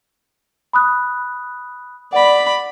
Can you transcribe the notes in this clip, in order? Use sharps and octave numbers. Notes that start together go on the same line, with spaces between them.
B5 D#6 F#6
D5 F#5 B5